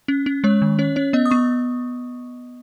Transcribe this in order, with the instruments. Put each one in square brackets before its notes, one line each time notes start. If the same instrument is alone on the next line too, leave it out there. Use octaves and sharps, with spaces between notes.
[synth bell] C#4
C#4
G#3 C#5
D#3
C#4 C#5
C#4 C#5
B3 D#5
D#6
B3 C#6